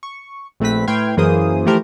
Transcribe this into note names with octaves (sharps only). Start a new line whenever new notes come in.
C#6
A#1 A3 C4 B4 B6
A2 B4 G5 C6 F6 G#6
F#2 E3 A#3 G#4 C5 D#6
E3 F3 A3 G4 A#4 C5